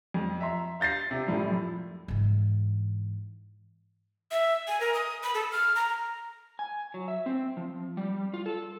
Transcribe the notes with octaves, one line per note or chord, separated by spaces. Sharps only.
F2
E5 A#5 C6
F5 G6 A6 A#6 C7
C3
F#2 A2 F3 G3
G#2 E3
E5
G#5
A#4
D#6
B5
A4
F6
A#5
G#5
F#3
E5
C4
F3
G3
F4
A4